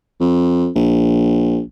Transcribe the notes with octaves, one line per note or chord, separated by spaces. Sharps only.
F2
A#1